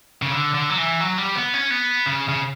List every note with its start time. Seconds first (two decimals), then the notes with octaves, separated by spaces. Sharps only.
0.22 C#3
0.31 D3
0.54 D3
0.70 F#3
0.78 E3
1.00 F#3
1.18 G3
1.35 B3
1.54 C#4
1.71 B3
2.06 C#3
2.29 C#3